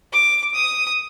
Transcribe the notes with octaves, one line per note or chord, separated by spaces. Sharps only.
D6
D#6